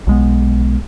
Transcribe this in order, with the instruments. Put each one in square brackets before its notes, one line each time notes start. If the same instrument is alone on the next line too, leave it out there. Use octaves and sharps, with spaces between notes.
[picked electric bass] B1 G#3 B3